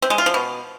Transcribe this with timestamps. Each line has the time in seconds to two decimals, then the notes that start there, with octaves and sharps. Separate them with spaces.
0.02 C4
0.10 G#3
0.18 F4
0.26 F3
0.34 B2